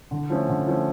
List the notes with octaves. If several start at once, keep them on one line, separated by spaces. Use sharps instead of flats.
D3
F3 A3 C#4
D3
F3 A3 C#4